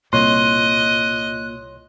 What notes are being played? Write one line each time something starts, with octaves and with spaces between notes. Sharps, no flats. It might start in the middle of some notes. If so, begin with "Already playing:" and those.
C2 A#2 C#5 D#5 C6 F#6